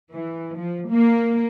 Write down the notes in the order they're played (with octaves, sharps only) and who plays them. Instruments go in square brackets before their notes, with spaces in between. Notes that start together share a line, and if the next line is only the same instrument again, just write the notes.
[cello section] E3
F3
A#3